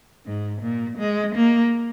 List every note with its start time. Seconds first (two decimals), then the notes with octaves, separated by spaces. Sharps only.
0.26 G#2
0.62 A#2
0.99 G#3
1.35 A#3